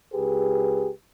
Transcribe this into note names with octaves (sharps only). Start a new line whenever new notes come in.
C#2 G4 G#4 B4